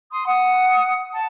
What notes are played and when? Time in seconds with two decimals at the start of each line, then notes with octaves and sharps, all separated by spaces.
0.11 C6 D#6
0.25 F#5 D#6
1.13 A5